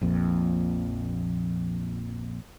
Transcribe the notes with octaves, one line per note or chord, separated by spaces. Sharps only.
A#1 F2 A#2